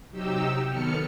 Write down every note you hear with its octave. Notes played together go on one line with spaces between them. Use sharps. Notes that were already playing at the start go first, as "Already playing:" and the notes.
C3 F#3 D#4 G4 G5 E6
D#3 F#3 B3 A4 F6 C#7